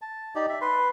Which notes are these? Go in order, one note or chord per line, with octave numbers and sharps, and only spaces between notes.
A5
D#4 G4 D5
E5
B4 C6